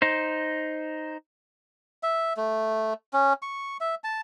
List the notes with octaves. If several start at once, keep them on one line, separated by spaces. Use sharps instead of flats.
D#4 C5
E5
A3
C#4
C#6
E5
A5